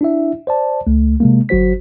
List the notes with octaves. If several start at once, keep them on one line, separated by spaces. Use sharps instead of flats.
D4 E4 E5
C5 D5 A5
C#2 A3
C3 G#3 A#3
G1 F#3 F#4 C5 B6